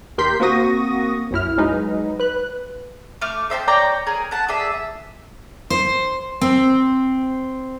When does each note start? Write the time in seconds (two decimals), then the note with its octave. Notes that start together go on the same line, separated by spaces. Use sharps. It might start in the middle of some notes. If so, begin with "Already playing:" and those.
0.18 D#2 G4 A#4 C6 G6 B6
0.40 A#3 C4 F#4 C#6 D#6 A#6
1.31 B1 F#2 E4 F6
1.57 F#3 G#3 D#4 B4
2.20 B4 F#6
3.21 A3 D6 F6
3.50 C5 E5 G5 A5
3.68 C#5 D5 G5 A#5
4.07 G#4 A#4 G#5 A#5
4.31 F#5 A5
4.48 G#4 D5 E5
5.70 C5
6.41 C4